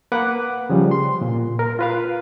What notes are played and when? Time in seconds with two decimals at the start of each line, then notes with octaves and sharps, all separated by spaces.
0.12 A#3 B4 F#5 D6
0.70 C#3 F3 G3
0.91 C6
1.22 A#2
1.59 A#4
1.79 F4 B4 F5